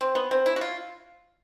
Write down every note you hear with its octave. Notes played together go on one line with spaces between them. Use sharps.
C4
B3
C4
E4
F#4
F4